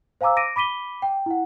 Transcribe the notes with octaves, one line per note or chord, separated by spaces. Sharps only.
C5 F5 G#5 A#5 D6 E6
D6 A#6 D7 D#7
B5 D6 B6 D#7 G7
G5
E4 F#5